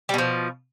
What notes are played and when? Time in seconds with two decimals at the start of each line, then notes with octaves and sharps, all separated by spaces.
0.09 G3
0.14 B2
0.18 F3